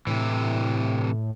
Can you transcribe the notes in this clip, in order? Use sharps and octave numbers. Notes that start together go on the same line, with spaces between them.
A2 C3 E3